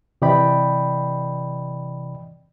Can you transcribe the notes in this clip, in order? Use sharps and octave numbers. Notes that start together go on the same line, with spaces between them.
C3 E3 D5 D#5 G5 B5